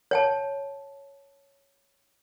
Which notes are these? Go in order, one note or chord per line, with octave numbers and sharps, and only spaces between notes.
C#5 G5 A5